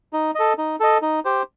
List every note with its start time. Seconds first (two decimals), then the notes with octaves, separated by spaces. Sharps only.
0.13 D#4
0.35 A4 D#5
0.58 D#4
0.80 A4 D#5
1.02 D#4
1.25 G4 C5